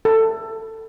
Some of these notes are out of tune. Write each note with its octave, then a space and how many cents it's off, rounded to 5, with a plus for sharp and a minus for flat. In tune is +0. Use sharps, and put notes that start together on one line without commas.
A4 +20